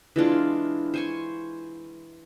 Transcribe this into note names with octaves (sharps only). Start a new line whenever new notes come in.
E3 G#3 D4 F4
C5 G#5 C#6